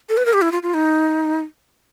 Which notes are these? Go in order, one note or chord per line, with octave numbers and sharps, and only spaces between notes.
A4
B4
A#4
G4
E4
F4
F4
D#4